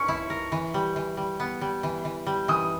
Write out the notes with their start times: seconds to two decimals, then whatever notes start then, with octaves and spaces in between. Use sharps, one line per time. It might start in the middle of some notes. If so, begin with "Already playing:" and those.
Already playing: C#4 C#6
0.08 E4
0.30 A#4
0.52 E3
0.74 G3
0.96 E3
1.17 G3
1.40 B3
1.61 G3
1.83 E3
2.05 E3
2.27 G3
2.48 E3 D#6